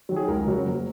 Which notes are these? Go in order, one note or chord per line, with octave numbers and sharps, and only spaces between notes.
D#3 F#3
G#4
C#2 A#4
C#3 F#3
F#1